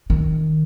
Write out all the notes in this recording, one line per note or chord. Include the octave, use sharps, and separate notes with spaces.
D#3